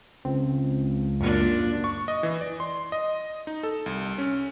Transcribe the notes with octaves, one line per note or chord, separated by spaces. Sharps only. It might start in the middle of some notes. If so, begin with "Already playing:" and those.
C#2 C4
F#2 A#2 D4
C#6
D#5
E3
D5
C6
D#5
D#4
A4
C2
C#4